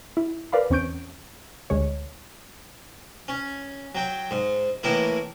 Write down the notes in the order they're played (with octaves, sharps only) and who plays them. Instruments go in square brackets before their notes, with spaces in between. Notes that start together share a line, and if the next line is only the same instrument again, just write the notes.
[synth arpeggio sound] E4
A#4 B4 D5 F5 B5
E2 C4 C#4 C#6 G6 D7
D2 D3 G#3 C#5
[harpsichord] C#4
F#3 G5
G#2
A2 E3 A#3 E4